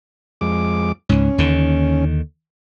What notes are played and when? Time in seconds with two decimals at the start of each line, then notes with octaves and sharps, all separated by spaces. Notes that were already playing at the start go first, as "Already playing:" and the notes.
0.41 F2 G#3 D6
1.09 C#2 G#2 C#4
1.38 D#2 D3 D#3